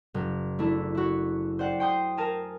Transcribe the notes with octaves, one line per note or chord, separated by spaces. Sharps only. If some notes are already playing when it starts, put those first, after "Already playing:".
F#1
A3 D4 E4
E4 F#4
C5 D5 F#5 G5
G5 C6 D#6 G6
A#4 G#5 A5